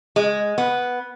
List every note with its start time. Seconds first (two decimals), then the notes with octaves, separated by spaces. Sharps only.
0.16 G#3
0.58 B3